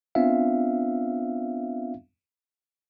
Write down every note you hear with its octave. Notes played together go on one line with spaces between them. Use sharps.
B3 C4 D4 F4 E5 F5